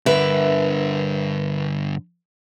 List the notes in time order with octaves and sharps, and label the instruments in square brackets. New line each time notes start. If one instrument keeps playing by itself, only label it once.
[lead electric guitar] G2 D3 [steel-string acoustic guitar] A#4 B4 E5